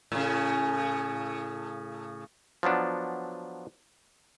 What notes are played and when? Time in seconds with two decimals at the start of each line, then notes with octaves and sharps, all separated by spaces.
0.12 A2 C#3
2.63 F3 F#3 B3 D4